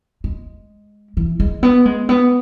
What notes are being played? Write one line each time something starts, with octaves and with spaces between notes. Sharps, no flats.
G#3
E3
G#3
B3
G#3
B3